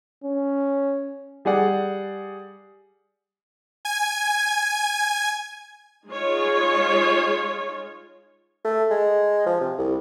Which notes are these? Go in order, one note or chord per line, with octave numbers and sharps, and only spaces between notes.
C#4
G3 G#4 D5 F#5
G#5 G#6
G#3 D#4 F4 G#4 C#5
A3
G#3
F3
C3
C2